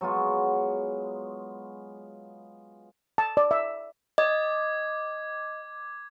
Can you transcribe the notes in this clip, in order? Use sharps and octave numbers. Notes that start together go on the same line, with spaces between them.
F#3 G#3 B3 F4
A5
D5
E5
D#5 D6 G#6